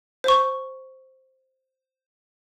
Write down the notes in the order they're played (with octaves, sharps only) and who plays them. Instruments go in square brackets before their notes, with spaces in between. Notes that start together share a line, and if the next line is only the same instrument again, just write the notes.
[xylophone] C5 C#6